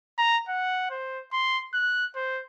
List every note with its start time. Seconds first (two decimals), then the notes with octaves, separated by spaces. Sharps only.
0.18 A#5
0.49 F#5
0.90 C5
1.32 C6
1.73 F#6
2.15 C5